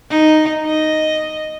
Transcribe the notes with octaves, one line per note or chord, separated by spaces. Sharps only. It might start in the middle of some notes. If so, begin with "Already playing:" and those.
D#4
D#5